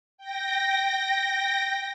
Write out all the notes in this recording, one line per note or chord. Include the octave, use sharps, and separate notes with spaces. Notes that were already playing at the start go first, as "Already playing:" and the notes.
G5 A#6